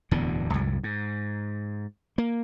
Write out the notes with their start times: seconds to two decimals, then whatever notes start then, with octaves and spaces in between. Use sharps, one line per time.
0.11 D1 E2 B2 D3
0.54 C2 F#2 A2
0.83 G#2
2.18 A#3